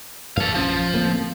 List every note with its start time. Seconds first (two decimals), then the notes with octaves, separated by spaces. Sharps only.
0.37 F#2 E3 A4 F5
0.54 A#1 F3 C4 C#4
0.93 D1 A#3 C4